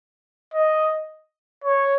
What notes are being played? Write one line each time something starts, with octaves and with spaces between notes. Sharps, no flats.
D#5
C#5